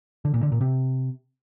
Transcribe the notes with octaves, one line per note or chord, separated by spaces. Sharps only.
D3
A#2
D3
A#2
C3